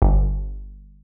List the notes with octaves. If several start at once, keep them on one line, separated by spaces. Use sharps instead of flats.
G1